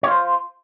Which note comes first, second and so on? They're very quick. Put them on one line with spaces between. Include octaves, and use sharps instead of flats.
C#5 F4 C5